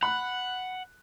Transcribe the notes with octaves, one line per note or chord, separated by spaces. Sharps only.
F#5 B5 F#6